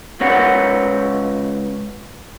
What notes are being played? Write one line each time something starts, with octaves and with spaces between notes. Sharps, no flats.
C#2 C#3 C#4 B4 C#5 F#5